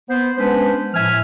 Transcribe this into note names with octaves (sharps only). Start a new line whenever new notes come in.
B3 C5
G#3 B3 C#4 D4 B4 C5
A2 F3 E5 G#5 F6